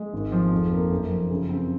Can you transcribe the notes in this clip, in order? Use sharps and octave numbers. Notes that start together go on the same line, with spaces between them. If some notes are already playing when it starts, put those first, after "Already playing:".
Already playing: G#3
G#1
F3
F2
A#3
F#2
F3
C#3
C4